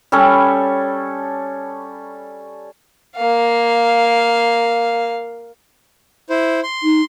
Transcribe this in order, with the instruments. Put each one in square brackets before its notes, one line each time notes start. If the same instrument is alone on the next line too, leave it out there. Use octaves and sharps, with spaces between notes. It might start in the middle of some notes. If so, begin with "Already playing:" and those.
[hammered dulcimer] G3 C#4 A4 C#5
[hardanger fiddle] A#3 F5
[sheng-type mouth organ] E4 C5
C6
[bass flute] D#4